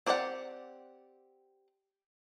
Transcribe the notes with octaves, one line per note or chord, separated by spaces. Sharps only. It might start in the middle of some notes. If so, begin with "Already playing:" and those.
C4 G4 C5 D5 F#5